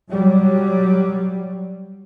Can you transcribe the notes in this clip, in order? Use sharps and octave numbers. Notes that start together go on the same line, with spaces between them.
F#3 G3